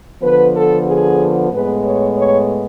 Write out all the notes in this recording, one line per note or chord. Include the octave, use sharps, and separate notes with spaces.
D3 F3 B3 B4
A4
G#4
A2 G#3 B3 B4
C#5
C#5